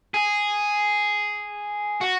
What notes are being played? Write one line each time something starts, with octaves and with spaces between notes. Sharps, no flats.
G#4
F#4